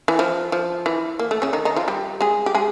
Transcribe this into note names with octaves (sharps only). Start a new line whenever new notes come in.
E3
F3
F3
E3
A#3
A3
C#3 C#4
D#3 D#4
D#3 D#4
F3 F4
G3 G4
G#3 G#4
G4
G#3 G#4